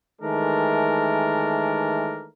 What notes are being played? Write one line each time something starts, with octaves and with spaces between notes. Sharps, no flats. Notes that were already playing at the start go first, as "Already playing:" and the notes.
D#3 E3 G#3 A3 D4 A#4